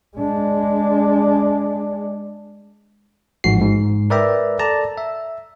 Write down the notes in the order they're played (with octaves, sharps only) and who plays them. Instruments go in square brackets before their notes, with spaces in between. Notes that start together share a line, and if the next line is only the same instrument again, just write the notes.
[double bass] G#3 D4
[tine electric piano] A1 G#2 F3 F#4 C7
G#2
A#4 B4 D5 E5 G5 A#5
A4 D5 A5 A#5
E5